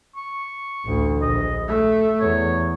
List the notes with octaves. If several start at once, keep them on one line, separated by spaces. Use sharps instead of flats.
C#6
A1 D2
A#1 D#5
A3 E5
E2 C#5